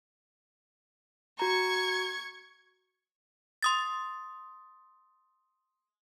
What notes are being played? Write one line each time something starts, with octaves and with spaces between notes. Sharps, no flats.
F#4 A#5 C#6 G#6
C6 D#6 A6